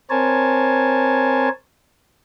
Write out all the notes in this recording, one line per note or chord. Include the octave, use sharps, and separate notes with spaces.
C4 A#4 C5 C#5 G#5 A5